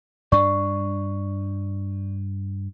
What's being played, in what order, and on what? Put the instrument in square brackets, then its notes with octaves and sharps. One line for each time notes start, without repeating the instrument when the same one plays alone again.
[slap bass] G2 D4 [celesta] D5 C#6